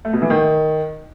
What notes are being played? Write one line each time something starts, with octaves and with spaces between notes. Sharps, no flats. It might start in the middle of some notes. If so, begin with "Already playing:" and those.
A3
B2
E3
D#3